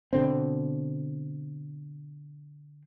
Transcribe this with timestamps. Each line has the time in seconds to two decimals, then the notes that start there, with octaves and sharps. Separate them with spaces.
0.13 B2 D3 C4